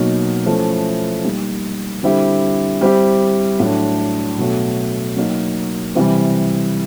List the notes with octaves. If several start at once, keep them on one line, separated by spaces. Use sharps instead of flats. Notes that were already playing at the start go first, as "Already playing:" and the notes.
Already playing: B2 F#3 A#3 D#4
F3 A3 C#4 E4
G3 A#3 D#4
D3 G3 C4 E4 G4
G3 C4 E4 G4
A2 F#3 A3 D4
B2 F#3 A3
F#3 A#3 D#4 F#4
C3 E3 G3